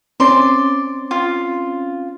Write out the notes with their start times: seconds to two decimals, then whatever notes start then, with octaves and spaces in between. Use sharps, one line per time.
0.20 C4 C#4 D5 C6
1.11 F4